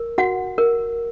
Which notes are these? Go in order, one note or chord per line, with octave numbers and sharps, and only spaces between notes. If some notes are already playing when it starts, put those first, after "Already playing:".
Already playing: A#4
F#4 F#5
A#4